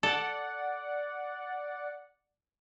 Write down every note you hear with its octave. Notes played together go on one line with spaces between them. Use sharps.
A4 D5 F#5